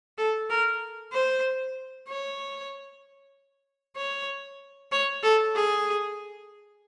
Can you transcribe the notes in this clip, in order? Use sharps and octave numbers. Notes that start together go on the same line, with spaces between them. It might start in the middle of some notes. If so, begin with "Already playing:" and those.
A4
A#4
C5
C#5
C#5
C#5
A4
G#4